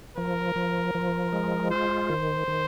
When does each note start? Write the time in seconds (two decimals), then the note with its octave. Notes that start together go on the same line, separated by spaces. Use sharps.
0.17 F3 A#4
0.56 F3
0.95 F3
1.33 G#3
1.71 F4 C5
2.10 D#3
2.48 D#3